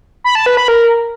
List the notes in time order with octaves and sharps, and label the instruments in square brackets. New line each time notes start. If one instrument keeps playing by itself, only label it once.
[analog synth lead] B5
A5
B4
B5
A#4